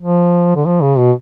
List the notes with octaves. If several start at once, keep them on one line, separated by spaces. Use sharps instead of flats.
F3
D3
F3
C#3
B2